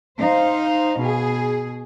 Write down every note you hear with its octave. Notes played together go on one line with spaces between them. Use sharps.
D#4 C5 F5
B2 G#4